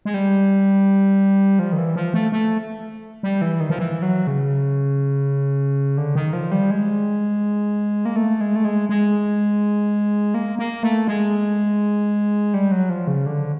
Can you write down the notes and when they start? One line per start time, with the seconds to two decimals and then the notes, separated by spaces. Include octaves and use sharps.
0.05 G#3
0.14 G3
1.59 F3
1.73 D#3
1.78 E3
1.96 F3
2.14 A3
2.32 A3
3.23 G3
3.42 E3
3.60 D#3
3.70 F3
3.79 E3
4.02 F#3
4.27 C#3
5.97 D3
6.15 D#3
6.33 F3
6.52 G3
6.71 G#3
8.05 A#3
8.16 A3
8.41 G#3
8.56 A3
8.65 G#3
8.89 G#3
10.34 A#3
10.59 A#3
10.83 A3
11.07 G#3
12.54 G3
12.72 F#3
12.90 F3
13.07 C#3
13.26 D3